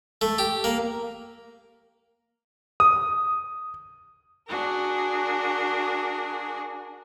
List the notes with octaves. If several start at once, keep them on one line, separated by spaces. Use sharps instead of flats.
A3
G4
A#3
D#6
D4 F#4 G#4 A#4